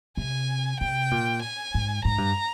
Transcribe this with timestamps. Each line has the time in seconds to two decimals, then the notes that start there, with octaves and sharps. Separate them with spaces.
0.17 C3 G#5
0.80 C3 G5
1.11 A#2
1.42 G#5
1.74 G#2
2.05 G#2 A#5
2.18 G2